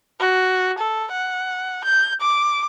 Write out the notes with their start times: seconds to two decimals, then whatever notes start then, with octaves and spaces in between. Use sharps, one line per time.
0.20 F#4
0.78 A4
1.12 F#5
1.84 G6
2.21 D6